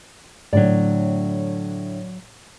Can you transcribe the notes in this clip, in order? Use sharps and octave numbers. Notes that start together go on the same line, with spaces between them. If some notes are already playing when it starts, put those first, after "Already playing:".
A2 D3 F#3 D5